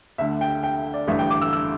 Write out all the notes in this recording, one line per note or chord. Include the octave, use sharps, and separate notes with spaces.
D2 D3 E5
G5
G5
D5
A1 G2 D3 E5
G5
D6
E6
E6